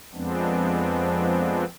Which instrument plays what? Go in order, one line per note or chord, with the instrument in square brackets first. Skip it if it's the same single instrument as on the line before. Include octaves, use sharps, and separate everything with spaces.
[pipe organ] F2 F3 G#3 B3 C4 D4